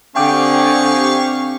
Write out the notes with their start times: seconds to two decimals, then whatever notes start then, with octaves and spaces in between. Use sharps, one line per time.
0.16 D3 C4 G4 G#4 F5 G5 C#6 D6